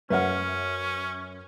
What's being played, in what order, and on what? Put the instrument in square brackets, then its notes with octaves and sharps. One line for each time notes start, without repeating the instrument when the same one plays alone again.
[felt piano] F#2 C#5 F6 [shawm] C#4 [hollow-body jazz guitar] B4 E5 F#5